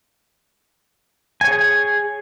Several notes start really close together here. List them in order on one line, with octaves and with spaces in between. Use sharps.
G#5 C#5 G#4